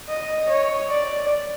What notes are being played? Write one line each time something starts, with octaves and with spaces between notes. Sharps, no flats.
D#5
C#5
D5